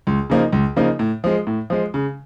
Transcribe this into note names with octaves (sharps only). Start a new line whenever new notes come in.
C#2
C#3 F3 A#3 D#4
C#2
C#3 F3 A#3 D#4
A2
F3 G#3
A2
F3 G#3
C#3